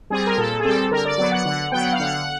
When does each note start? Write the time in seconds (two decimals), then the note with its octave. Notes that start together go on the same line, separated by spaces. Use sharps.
0.10 G3 C4 G#4
0.26 A#4
0.37 A#2 A4
0.59 G#4
0.65 G3 C4 A4
0.91 D3 A#4
1.05 D5
1.18 F#3 B3 D5
1.32 F#5
1.45 D3 F#5
1.72 F#3 B3 G5
1.81 F#5
1.93 F5
1.99 D3 F#5